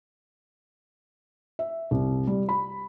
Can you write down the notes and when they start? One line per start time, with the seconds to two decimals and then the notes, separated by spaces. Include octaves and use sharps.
1.59 E5
1.91 C2
2.27 G3
2.49 B5